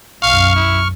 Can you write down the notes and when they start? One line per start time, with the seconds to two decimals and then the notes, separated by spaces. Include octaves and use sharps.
0.22 B1 F#2 F5 C#6 F6
0.56 E4